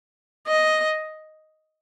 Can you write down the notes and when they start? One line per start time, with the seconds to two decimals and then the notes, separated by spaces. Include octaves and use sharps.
0.47 D#5